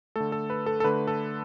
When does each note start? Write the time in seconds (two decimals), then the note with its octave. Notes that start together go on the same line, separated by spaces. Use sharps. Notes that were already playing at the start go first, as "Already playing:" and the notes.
0.16 D3 A3 A4
0.32 A4
0.50 B4
0.66 A4
0.80 A4
0.84 D3 A3 B4
1.07 A4